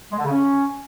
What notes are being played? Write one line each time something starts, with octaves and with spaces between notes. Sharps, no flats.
G#3
D3
C#3
C#4